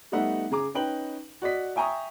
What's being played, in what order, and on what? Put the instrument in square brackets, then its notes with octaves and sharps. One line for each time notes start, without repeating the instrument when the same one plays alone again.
[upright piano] G3 A3 B3 D#4 E5 F#5
C#3 G#4 A#5 D6
C#4 D#4 B4 G5 F#7
F#4 D5 D#5 B6
E5 G5 G#5 A#5 C#6 D#6